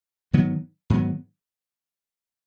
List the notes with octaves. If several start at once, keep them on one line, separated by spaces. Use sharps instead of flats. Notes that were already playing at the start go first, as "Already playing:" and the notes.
G#2 D#3 F#3 B3
G#2 D#3 F#3 B3